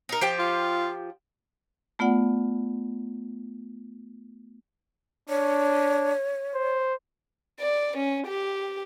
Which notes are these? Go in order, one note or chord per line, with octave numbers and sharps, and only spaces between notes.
D#4 A#4
F3 G4 G5
F4
A3 B3 F4 D5 F#5
D4 C#5
C5
D5
C#4
G4